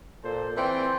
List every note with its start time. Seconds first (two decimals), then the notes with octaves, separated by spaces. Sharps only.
0.24 A#2 A4 C5
0.57 E3 C4 C5 D5 G5